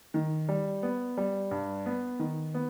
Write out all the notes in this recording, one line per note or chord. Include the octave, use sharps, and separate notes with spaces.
D#3
G3
B3
G3
G2
B3
D#3
B3